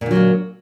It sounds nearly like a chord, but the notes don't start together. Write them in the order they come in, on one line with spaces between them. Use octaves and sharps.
A#2 D3 F#3 A#3